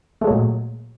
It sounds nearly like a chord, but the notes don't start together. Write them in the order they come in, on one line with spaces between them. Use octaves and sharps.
A3 G#3 F#3 A#2